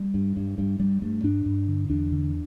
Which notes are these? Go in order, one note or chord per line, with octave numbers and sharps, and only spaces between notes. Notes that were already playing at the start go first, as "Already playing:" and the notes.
Already playing: G3
G2
G2
G2 G3
G2 G3
G2 A3
G2 D4
G2
D3
E2 D4
D3